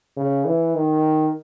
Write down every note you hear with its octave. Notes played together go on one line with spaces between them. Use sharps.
C#3
E3
D#3